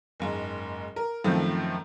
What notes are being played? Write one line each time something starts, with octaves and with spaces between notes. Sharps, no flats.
F#1 G#2
A#4
F#2 A2 D#3 F3 A3 C4